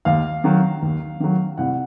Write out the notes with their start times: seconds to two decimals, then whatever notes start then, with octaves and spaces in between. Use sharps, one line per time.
0.05 D#2 F5
0.44 D#3 F#3
0.82 D#2
1.20 D#3 F#3
1.58 C2 F#5